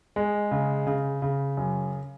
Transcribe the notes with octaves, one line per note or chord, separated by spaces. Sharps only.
G#3
C#3
C#3
C#3
F#2